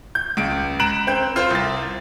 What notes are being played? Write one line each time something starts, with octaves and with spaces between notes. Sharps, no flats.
G6
C#2 D7
A#5 B5 F#6 D7 E7 F#7
C4 G5 G6
F4 C5
C2 A6